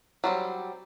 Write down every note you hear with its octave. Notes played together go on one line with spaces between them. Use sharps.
F#3 G3 C4